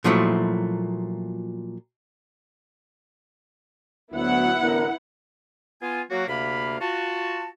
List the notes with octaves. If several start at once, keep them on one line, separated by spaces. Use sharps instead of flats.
A#2 F3 F#3 A3 E4
D2 F#3 B3 E4 F#5
A1 D3 A#4
B3 F4 G#5
F#3 A#3 F#4
D2 C3 A#3 F5 B5
F4 F#4 A5